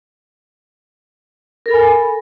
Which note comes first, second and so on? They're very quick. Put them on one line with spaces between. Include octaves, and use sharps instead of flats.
A#4 A4 B5 G#5